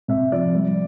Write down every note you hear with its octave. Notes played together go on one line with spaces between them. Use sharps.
C3 E5
F3 D5
G3